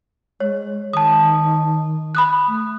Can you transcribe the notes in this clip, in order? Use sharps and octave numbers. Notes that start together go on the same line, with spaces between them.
G#3 C#5
D#3 A5 D#6
B5 D#6 F#6
A3